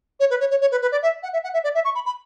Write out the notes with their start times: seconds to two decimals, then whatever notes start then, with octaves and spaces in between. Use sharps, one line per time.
0.20 C#5
0.30 B4
0.40 C#5
0.50 C#5
0.61 C#5
0.72 B4
0.82 B4
0.92 D5
1.02 E5
1.23 F#5
1.33 E5
1.44 F#5
1.54 E5
1.64 D5
1.75 E5
1.85 C#6
1.95 B5
2.06 B5